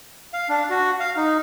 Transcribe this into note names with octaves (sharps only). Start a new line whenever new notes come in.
F5
D4
F#4
F5
D#4